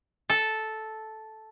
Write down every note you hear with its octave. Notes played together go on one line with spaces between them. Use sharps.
A4